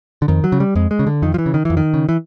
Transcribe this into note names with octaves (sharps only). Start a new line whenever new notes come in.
D3
F2 D#3
F#3
C#3
G3
F2 G#3
G#3
C#3
D3
F2 D#3
F3
E3
C#3
D#3
F2 E3
D#3
C#3
E3